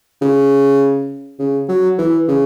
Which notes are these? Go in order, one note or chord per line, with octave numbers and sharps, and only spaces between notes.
C#3
C#3
F#3
E3
C#3